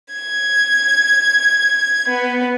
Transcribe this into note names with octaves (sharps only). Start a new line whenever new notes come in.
G#6
B3